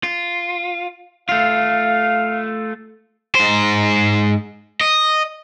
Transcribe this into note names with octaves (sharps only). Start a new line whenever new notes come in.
F4
A3 F4 F5
G#2 C5
D#5